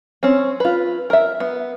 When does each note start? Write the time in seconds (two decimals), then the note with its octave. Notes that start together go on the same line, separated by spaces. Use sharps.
0.23 C4 C#4
0.60 F4 B4
1.10 A#4 E5
1.40 B3